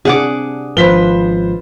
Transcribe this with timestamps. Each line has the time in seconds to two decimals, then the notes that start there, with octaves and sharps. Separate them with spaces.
0.05 C3 D4 G#4 F#5 D6
0.77 G#1 F3 B4 C5 B6 G7